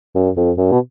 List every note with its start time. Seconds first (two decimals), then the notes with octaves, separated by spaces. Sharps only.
0.15 F#2
0.37 F2
0.58 F#2
0.72 B2